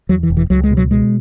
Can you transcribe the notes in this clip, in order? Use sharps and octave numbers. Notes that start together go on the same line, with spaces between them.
E2 F#3
E3
E1
E3
C#2 F#3
G#3
B2
F#3
B2 G#3